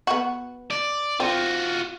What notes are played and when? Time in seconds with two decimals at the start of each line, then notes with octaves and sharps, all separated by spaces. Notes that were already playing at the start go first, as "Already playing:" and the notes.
0.07 B3 F#4
0.71 D5
1.20 C4 F4 F#4